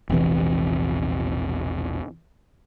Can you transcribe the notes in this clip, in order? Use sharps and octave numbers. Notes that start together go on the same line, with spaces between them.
E1 A#1 C3 E3